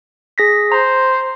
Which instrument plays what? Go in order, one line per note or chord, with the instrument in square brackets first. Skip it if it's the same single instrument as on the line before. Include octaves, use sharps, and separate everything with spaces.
[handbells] G#4 A#6 B6
[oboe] C5 [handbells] A#5